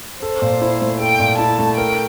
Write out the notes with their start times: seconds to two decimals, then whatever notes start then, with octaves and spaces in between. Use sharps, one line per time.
0.22 A4 C5
0.42 A#2
0.61 E4
0.81 A3
1.00 A4 G5
1.20 A#2
1.38 E4 A5
1.58 A3
1.77 A#4 G5